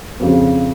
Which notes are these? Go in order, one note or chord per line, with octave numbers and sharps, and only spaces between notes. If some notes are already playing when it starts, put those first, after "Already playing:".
F2 C#3